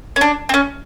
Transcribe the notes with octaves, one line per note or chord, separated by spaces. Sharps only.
C#4
D4
C4
C#4